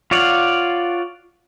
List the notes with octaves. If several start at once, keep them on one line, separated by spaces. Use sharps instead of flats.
F4 C#5 D5 F5 F#5